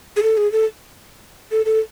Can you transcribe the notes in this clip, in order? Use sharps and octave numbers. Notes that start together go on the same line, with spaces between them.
G#4
A4
G#4
A4
A4
A4